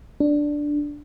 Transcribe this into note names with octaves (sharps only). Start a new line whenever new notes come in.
D4